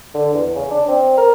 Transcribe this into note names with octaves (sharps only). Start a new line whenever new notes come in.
D3
E2
C#3
D4
C4
A#4